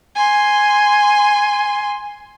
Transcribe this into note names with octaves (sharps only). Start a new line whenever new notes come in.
G#5 C6